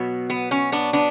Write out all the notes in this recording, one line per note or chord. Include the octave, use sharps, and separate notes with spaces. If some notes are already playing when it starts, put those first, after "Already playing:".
Already playing: B2 F#3 B3
B3
C#4
B3 D4
B3 D4